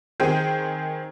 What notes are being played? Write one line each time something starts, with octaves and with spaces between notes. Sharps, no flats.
D#3 C4 G#4 C5 G5 D#7